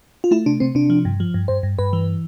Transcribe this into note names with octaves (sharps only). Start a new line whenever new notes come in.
F4
A3 E4
C3 D4
C3 C4
C3 D4
F3
G2
F3
G2
G2 C5
G2
G2 B4
E3